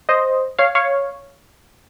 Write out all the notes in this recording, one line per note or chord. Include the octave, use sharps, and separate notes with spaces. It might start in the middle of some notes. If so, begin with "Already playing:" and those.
C5 D#5
C#5 F5
C#5 F5